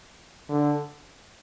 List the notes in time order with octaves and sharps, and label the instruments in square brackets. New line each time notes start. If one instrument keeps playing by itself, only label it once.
[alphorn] D3